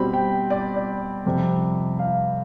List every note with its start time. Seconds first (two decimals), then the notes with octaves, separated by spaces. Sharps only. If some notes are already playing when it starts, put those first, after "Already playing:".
Already playing: B2 G3 C4 B5
0.13 G5
0.50 D5
0.76 D5
1.26 F2 C3 G3
1.99 F5